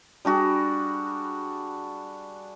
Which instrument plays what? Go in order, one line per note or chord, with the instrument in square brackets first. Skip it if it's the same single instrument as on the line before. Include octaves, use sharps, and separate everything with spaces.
[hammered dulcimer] G3 D4 F#4 G#4